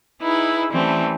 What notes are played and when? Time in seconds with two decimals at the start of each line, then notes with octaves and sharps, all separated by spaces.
0.20 D#4 E4 G#4 B4
0.71 E3 G3 A3 C4 C#4